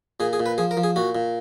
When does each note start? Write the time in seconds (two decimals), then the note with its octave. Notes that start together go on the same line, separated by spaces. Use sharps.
0.20 A#2 G#4
0.33 G#4
0.40 A#2
0.46 B4
0.58 F3 G#4
0.71 A#4
0.77 F3
0.83 G#4
0.96 A#2 F#4
1.15 A#2